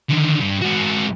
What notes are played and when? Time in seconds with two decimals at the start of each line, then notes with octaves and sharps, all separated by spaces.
0.10 D3 D#3
0.41 G2
0.62 G#2 F#4